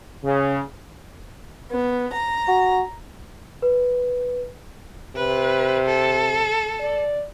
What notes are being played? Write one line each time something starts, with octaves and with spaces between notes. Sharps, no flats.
C#3
B3
A#5
F#4
B4
C3 B4
A4
D5